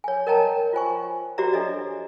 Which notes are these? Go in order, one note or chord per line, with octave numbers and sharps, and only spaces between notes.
C#5 G#5
A#4 C#5 D#5 G5 A5 A#5
F4 C5 G#5 C#6
F#4 G4 C5 D5 E5 A#5
D4 A4 C#5 D#5 E5